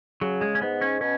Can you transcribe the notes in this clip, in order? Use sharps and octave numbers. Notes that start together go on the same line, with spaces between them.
C#3 F#3
G#3
C#4
G#2 B3
C#4
B2 C#4